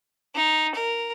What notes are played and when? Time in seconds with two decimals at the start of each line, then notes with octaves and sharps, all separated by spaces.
0.35 D#4
0.75 A#4